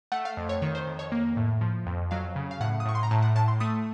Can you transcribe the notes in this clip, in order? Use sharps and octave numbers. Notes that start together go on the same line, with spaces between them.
A3 F#5
F5
F2
C#5
D#3 C#5
C5
F2
C#5
A#3
A2
F3
F2
F#3 F5
C#3
F5
A2 F#5
D#6
A2 C#6
C6
A#5
A2 A5
F#5
A2 A5
C6
A3 D#6